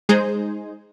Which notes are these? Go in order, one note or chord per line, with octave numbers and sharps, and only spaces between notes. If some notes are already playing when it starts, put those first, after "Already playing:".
G#3 D#4 G#4 C5